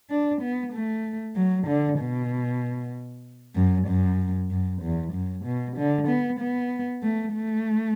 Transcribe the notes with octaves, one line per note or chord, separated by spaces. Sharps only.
D4
B3
A3
F#3
D3
B2
F#2
F#2
F#2
E2
F#2
B2
D3
B3
B3
A3
A3